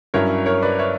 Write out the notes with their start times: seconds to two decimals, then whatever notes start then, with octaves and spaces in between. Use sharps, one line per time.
0.14 G2 F#3 C#4 E4 A#4 C#5
0.46 A#4 C#5
0.62 B4 D5
0.79 C#5 E5